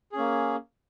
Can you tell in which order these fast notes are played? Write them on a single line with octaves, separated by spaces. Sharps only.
G#4 C#4 A#3